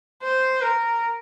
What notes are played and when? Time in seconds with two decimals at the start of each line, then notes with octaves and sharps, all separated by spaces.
0.23 C5
0.62 A#4